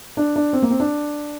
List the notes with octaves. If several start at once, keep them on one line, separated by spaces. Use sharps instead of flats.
D4
D4
C4
A#3
C4
D4